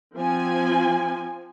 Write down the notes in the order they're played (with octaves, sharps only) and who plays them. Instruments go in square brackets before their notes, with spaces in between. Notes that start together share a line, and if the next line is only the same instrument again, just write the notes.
[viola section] F3 C4 G#5